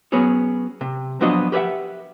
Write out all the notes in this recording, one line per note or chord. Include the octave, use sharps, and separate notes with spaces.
F#3 B3 C#4 G#4 C#5
C3
F3 F#3 B3 D4 F#4 D#5
G4 B4 C#5 E5 F#5